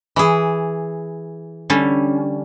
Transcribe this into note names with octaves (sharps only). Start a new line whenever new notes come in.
E3 G#4
D3 G3 C#4